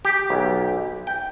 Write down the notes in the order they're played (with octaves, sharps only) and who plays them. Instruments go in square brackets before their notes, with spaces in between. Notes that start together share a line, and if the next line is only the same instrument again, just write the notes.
[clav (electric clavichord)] G4
B1
G5